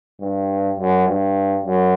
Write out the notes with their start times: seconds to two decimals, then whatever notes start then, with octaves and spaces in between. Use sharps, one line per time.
0.21 G2
0.79 F#2
1.08 G2
1.65 F#2